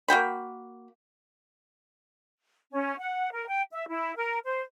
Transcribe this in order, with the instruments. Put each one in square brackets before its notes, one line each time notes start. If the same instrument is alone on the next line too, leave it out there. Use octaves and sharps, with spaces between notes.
[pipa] A#3 F#4 G5 B5
[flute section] C#4
F#5
A#4
G5
E5
E4
A#4
C5